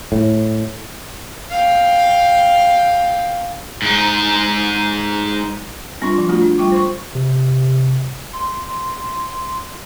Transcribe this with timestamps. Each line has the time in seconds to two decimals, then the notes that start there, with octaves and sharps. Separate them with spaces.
0.12 A2
1.50 F5 G5
3.82 G#2 D#4
6.01 G3 C4 D4 F4 C6 C#6
6.15 F3 C6
6.29 A3 C4 D4 F4 F#4
6.42 D4
6.58 G3 F4 G5 C#6 D6
6.72 C5 C6 C#6
7.15 C3
8.33 C6